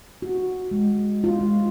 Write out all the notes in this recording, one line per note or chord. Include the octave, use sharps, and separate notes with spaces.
F#4
G#3
F4
G#3